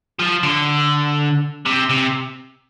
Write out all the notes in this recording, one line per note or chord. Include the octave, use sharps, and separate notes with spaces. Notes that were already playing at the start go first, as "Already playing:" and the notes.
F3
D3
C3
C3